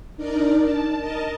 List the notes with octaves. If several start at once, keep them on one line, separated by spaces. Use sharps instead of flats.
D4 D#4 A#4 D5
A5
A#4 D#5 A5